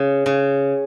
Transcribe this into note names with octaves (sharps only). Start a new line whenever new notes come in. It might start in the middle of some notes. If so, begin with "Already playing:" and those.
Already playing: C#3
C#3